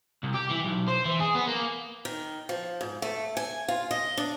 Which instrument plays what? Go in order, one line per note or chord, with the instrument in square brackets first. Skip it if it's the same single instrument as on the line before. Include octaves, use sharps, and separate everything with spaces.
[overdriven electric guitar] C2
G4
E3
B1
C5
E3
G#4
B3
A#3
[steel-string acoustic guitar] D#3
F3
G#2
A3
G#5
F4
D#5
D4